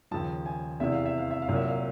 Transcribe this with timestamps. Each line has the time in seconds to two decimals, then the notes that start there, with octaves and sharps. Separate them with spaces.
0.11 D#2 C#3 F3 A5
0.46 G#5
0.80 E2 C3 E3 E5
0.92 F5
1.05 E5
1.18 F5
1.31 E5
1.42 F5
1.48 C2 A#2 F#3
1.56 E5
1.68 F5